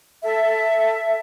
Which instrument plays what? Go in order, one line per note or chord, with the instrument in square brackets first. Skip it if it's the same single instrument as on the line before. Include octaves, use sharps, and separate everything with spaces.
[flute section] A4 E5